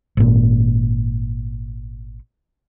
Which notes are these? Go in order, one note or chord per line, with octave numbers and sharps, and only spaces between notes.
G#1 A#2